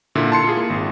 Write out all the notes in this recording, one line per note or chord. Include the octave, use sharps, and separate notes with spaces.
A#2 D3 E4
A5 C6 C#7
F4 G#4
A#3
G#1